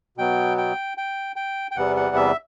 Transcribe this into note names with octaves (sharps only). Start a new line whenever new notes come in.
B2 F#3 B3 G5
G5
G5
G5
G5
E2 C3 E3 G3 B3 F#5
F#5
E5